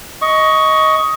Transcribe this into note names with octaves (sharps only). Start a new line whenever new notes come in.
D#5 C#6